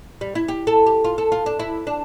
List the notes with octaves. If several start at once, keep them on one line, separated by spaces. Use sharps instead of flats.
G3
E4
G4
A4
G4
F4
A4
F4
D4
E4
D4